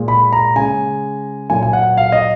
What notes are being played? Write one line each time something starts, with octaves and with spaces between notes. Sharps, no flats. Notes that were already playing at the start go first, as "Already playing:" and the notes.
Already playing: A#2 G#3
B5
A#5
C#3 G#3 G#5
A#2 F#3 G#5
G#5
F#5
F5
D#5